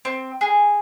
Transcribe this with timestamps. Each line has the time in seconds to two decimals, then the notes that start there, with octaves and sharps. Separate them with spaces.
0.05 C4
0.41 G#4